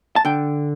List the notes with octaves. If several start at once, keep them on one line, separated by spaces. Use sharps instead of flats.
A5
D3 G5